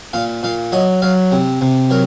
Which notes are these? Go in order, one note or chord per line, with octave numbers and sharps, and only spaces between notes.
A#2 F5
A#2 F5
F#3 D#5
F#3 F5
C3
C3
F#3 A#4